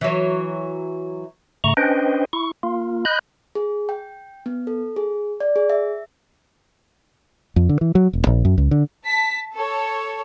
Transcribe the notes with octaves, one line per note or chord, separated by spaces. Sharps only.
E3 F#3
G#2 C#3 A3 A#5 C#6
C#4 D4 B4 C5 D#5 G5
E4 C#6
A#3 F4
D#5 B5 F#6 G6
G#4
G5
B3
A4
G#4
D5
G#4
E5
F2
D3
E3
F#3
E1
A#1
F#2
C#2
D3
A5 B6
A4 C#5